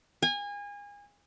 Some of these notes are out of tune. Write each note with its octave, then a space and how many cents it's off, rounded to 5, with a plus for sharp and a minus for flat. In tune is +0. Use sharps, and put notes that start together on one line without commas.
G#5 -30